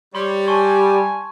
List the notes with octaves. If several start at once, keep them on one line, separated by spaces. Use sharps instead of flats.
G3 C#5 C6
G#5 A5 C6 C#6